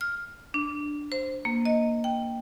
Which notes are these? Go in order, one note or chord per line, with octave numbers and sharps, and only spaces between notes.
F6
D4
C5
A#3
D#5
G5